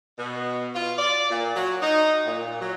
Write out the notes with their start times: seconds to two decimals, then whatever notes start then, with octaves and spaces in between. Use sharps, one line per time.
0.18 B2
0.75 F4
0.98 D5
1.30 A#2
1.55 F#3
1.82 D#4
2.26 A#2
2.61 F#3